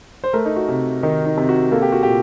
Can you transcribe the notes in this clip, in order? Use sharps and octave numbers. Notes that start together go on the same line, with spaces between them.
C5
A3 A#4
D#4
F#4
C3
D#3 D#4
D#4
C3
F#4
A#3 A4
G4
F#4
A#2 G4